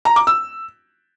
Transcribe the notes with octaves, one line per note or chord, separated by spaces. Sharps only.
A#5
D6
E6